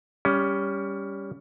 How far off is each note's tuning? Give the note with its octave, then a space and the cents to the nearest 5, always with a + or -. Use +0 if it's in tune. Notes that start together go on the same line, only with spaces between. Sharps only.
G3 +15 C#4 +20